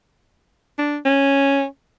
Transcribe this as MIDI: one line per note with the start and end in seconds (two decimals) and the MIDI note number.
0.78 0.98 62
1.05 1.65 61